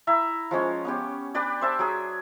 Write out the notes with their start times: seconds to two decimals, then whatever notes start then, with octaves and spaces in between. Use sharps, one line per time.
0.07 E4 E5 A#5
0.51 F3 G#3 C#4 C#5
0.85 B3 C#4 G4
1.34 D4 G4 B4 D5
1.61 C5 E5 A5
1.79 F#3 G#4